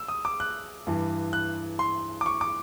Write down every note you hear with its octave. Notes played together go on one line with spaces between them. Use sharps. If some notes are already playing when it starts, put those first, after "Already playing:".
Already playing: E6
D#6
D6
F#6
G2 E3
F#6
C6
D6
C#6
D6